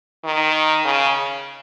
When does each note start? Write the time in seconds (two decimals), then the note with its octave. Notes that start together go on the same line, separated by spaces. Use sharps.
0.25 D#3
0.85 C#3